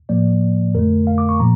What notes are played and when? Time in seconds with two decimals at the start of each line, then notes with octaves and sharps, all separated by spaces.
0.09 A2 F3 A#3 D5
0.74 F2 D3 A3 A#4
1.07 F5
1.18 D6
1.29 C#6
1.40 A#2 F3 A#3 A#5